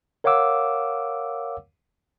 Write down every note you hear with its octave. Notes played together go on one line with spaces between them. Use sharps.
A#4 C#5 F5 F#5 D6 E6